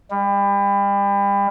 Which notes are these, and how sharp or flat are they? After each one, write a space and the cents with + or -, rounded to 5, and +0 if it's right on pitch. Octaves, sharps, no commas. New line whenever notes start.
G3 +35